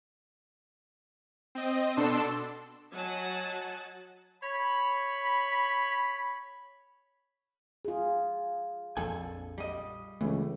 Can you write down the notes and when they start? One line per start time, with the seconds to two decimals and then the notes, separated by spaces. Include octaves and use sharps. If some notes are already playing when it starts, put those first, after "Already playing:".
1.55 C4 D#5
1.96 B2 D4 A4 C6 E6 E7
2.91 F#3 D#5 F#5 G#5 A5
4.42 C#5 B5
7.85 F4 G#4
8.97 A#1 F2 A4 G#5
9.58 G3 D#5
10.21 C#2 E3 A3